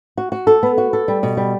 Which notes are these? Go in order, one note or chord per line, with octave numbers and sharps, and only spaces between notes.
F#4
F#4
A4
B3
F#4
A4
G3
B2
G3